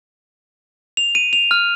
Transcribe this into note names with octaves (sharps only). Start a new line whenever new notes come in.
F7
D#7
F7
F6